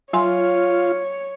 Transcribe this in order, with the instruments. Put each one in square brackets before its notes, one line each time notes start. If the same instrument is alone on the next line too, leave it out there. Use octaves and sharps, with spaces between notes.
[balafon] F#3 G#5 C6 [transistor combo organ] F4 [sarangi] C#5